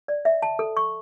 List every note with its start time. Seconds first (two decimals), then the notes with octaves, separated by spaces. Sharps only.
0.08 D5
0.25 E5
0.42 A5
0.59 A4
0.77 C#6